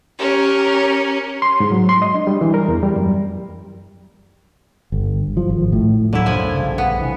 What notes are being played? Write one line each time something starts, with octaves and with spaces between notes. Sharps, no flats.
C#4 G4 A#4 C#5
C6
G#2
F#3
C6
D#5
D4
G3
E3
A#4
E2
G3
F#2
G1
F3
G#1
A2
D#2 D3 F#3 A#3 E4
C2 F#2 F3 G#5
A#1 G2 C#3
B3
C3 E3